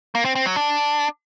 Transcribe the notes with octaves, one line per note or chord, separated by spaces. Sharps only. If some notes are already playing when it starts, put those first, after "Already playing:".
A#3
C4
C4
F#3
D4